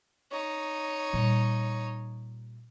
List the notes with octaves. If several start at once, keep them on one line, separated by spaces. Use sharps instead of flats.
D#4 C#5
A#2 G3